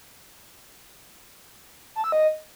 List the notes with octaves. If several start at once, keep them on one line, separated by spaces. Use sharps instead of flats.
A5
E6
D#5